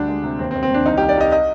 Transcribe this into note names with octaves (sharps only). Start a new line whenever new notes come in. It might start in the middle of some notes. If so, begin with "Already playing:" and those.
Already playing: D2 G3 D4
G#3
C3
D#2 C4
C4
D#2
C4
D#2 D4
C2 D#4
C2 G4
D5
C2 D#5
D#5